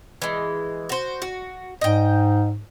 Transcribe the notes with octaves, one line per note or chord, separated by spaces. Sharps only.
E3 G#3
F#4 C5
F#4
G#2 D#5 G5